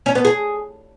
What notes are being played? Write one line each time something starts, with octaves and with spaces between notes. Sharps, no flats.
C#4
B3
G#4